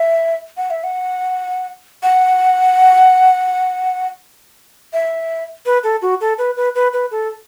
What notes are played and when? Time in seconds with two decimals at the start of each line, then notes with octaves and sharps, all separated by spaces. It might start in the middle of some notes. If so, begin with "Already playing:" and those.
Already playing: E5
0.57 F#5
0.70 E5
0.84 F#5
2.03 F#5
4.93 E5
5.66 B4
5.84 A4
6.02 F#4
6.21 A4
6.38 B4
6.57 B4
6.75 B4
6.93 B4
7.11 A4